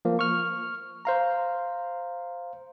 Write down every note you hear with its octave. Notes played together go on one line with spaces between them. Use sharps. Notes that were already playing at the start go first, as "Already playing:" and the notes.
F3 A#3
C#6 F6
C5 F5 A#5